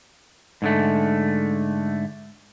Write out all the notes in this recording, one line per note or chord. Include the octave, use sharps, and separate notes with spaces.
G#2 D3 A3